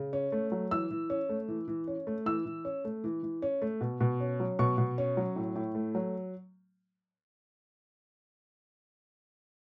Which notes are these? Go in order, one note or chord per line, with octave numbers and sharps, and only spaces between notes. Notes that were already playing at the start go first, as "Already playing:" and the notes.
Already playing: C#3
C#4
A3
F#3
E3 E6
E3
C#4
A3
E3
E3
C#4
A3
E3 E6
E3
C#4
A3
E3
E3
C#4
A3
B2
B2
C#4
F#3
B2 C#6
B2
C#4
F#3
A2
A2
A3
F#3